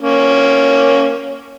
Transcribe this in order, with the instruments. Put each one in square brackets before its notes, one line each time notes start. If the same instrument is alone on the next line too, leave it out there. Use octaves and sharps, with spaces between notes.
[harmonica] A#3 C#4